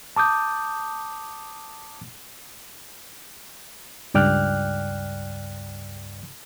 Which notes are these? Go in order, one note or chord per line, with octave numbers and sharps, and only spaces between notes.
A5 D6 D#6 G6
C#2 G2 D5 G5 F6 F#6